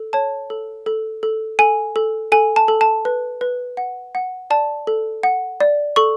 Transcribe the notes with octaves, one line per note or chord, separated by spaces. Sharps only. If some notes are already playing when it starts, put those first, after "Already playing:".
Already playing: A4
C#5 A5
A4
A4
A4
A4 G#5
A4
A4 G#5
A5
A4
A5
B4
B4
F#5
F#5
D5 A5
A4
F#5
D5
A4 C#6